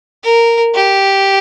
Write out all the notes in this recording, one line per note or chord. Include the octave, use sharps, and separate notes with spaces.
A#4
G4